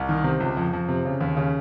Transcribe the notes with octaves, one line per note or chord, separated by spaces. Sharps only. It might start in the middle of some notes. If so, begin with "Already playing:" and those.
Already playing: C2
D#3
C3
C#2
F2
F2
C3
C#3
D#2
C#3